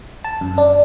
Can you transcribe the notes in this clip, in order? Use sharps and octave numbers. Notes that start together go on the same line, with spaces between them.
A5
F#2
D4